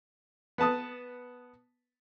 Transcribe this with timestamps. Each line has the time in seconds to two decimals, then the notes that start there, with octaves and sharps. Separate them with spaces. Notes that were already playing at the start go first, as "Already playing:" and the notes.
0.58 B3 B4 A5 D#6